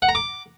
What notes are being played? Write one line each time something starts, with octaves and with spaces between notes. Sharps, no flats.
F#5
A#5
D6